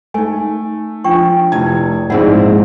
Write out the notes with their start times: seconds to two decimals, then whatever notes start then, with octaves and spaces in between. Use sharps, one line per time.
0.14 A3 D#4 G#5
1.04 F3 D4 G5 C#6
1.52 F1 E4 A5 G#6
2.10 A#1 G#2 C4 E4 G#4 F#5